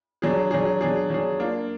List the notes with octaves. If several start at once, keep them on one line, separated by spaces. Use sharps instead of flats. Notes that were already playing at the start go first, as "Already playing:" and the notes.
F#3 D4 G#4
F#3 D4 G#4
F#3 D4 G#4
F#3 D4 G#4
A#3 D4 F4